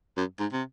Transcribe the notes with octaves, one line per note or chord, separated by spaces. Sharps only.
F#2
G#2
C3